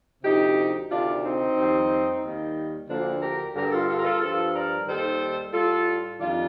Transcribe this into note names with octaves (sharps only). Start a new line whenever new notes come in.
D2 C3 F3 D#4 G4
D2 C3 D#3 D4 F4
C4 D#4
F2 D#3 G3
D#2 D#3 G3
D2 D3 F3 A#3 D4
G4 A#4
G2 D3 G3 G4 A#4
F4 A4
F4 A4
A#4
F4 A4
G2 F3 F4 A4
A#4 D5
D#2 D#3 G3 A4 C5
A2 G3 F4 A4
F2 D#3 G3 D4 F4